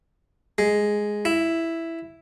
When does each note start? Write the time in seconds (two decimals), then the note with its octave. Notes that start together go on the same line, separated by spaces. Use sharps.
0.58 G#3
1.25 E4